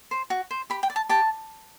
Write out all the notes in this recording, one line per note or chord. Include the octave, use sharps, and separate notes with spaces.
C5
F#4
C5
G4 B5
G5
D5
A5
G4 A5